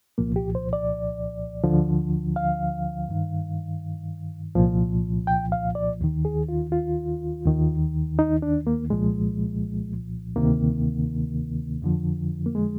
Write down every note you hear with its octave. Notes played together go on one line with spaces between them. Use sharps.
C2 A#2 F3 A#3
G4
C5
D5
D2 D3 F3
F5
G2 D#3
C2 A#2 F3
G5
F5
D5
D#2 D#3
G#4
F4
F4
D#2 D#3
D#4
D4
A#3
C2 A#2 F3 G#3
D2 C3 D#3 A#3
F2 D3 F3
A#3
G#3